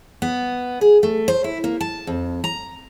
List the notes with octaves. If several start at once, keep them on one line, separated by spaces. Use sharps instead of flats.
B3
G#4
A3
C5
E4
A#3
A5
F2
A#5